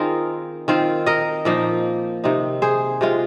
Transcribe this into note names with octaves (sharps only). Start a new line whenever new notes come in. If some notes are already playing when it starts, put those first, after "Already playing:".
Already playing: D#3 C4 D#4 F4 G#4 A#4
D#3 C4 F4
A#4 D#5
A#2 F3 A#3 D#4
C3 D#3 C4 D#4
G#4 C5
C3 G#3 F4